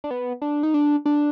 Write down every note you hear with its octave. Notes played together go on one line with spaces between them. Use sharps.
D4
B3
D4
D#4
D4
D4